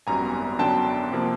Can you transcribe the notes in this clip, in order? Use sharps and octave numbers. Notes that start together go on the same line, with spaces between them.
G#1 F#2 D#3 G3 B3 G#5 A#5
F#2 D3 F#3 B3 D4 G5 A5
C3 F3 A#3